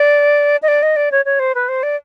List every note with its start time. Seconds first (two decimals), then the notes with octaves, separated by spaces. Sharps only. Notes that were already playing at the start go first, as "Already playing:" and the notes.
Already playing: D5
0.62 D#5
0.68 D5
0.83 D#5
0.96 D5
1.12 C#5
1.25 C#5
1.39 C5
1.55 B4
1.69 C5
1.83 D5